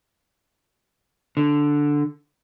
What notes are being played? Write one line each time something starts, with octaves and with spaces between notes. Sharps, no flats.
D3